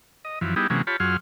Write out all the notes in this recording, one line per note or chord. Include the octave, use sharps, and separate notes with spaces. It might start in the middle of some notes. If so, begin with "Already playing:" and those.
D#5
F#2 E3 F3
G3 B3 D#4 E4 G4 G#4
C3 E3 F#3 G#3 A#3 C#4
F4 G4 C#5 A5 B5
F#2 F#3 F4 G#4 C6 F6